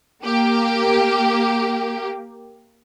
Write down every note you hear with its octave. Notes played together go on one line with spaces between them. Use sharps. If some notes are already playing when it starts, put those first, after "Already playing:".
A#3 G4